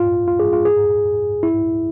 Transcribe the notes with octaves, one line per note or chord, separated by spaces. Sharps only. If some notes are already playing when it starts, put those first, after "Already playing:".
Already playing: F4
F4
G#4
F4
G#4
E4